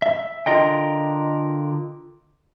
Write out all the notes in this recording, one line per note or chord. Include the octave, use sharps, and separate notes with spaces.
E5
D3 F4 A#4 D#5 G5